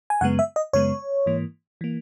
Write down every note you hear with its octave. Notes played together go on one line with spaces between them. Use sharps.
G#5
F#2 C#3 G#3 B3 F#5
E5
D#5
F#2 C#3 G#3 B3 C#5
G#2 E3 A#3
E3 A#3